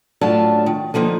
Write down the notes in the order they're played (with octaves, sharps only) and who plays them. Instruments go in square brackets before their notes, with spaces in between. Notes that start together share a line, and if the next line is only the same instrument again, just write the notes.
[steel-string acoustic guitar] A2 F#3 C#4 D4 F4 A5
D#3
D3 F3 A#3 D#4